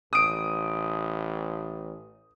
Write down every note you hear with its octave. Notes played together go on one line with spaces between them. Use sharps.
A1 D#6 D7